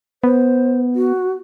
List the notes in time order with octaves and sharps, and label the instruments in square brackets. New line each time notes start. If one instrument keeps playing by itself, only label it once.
[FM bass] B3 [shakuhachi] C5
[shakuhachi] F#4